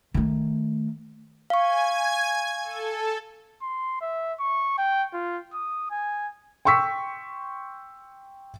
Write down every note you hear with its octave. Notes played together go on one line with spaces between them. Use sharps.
D#3 A3
F5 G#5 C#6 G#6
A4
C6
E5
C#6
G5
F4
D#6
G#5
G5 C6 C#6 E6 B6